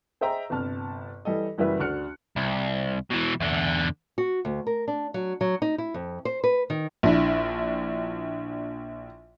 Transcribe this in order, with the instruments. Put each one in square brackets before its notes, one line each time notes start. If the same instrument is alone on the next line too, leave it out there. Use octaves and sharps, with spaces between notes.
[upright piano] G#4 C5 D#5 E5 G5 A#5
G1 C3 A5 F6
E3 G3 A4 D#5
F#1 E3 G3 F#4 B4 E5
D2 D4 F#4 F6 F#6 C#7
[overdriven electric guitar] C2
B2 E3
E2 D3
[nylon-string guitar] F#4
D2
A#4
D4
F#3
F#3
D#4
E4
F2
C5
B4
D#3
[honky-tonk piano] A#1 D4 E4